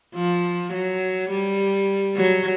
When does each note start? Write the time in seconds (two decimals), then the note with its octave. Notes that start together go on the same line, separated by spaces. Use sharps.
0.15 F3
0.73 F#3
1.31 G3
2.17 F#3